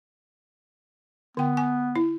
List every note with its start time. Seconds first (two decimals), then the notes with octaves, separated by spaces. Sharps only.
1.37 D3 B3 G5
1.57 G#5
1.96 E4